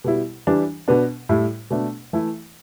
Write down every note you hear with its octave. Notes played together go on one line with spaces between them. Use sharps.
B2 G3 E4
E3 G3 D4
B2 B3 D4
A2 G3 E4
B2 A3 D4
E3 A3 E4